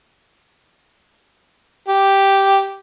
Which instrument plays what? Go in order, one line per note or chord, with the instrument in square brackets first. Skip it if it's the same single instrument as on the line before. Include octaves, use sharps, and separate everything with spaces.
[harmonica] G4